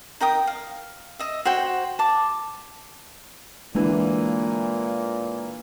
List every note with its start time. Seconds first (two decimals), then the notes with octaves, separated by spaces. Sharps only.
0.20 D#4 A#4 G5 D#6
0.47 F5
1.19 D#5 E5
1.45 F#4 C5 F#5 G5
1.99 A5 D6
3.75 A#2 D3 E3 G#3 A#3